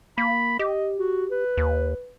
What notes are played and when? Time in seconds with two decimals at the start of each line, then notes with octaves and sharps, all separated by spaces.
0.18 A#3 B5
0.59 G4 D#5
0.98 F#4
1.31 B4
1.57 D#2